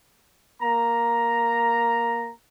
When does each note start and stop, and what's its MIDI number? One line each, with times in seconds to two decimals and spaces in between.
0.62 2.30 58
0.62 2.30 82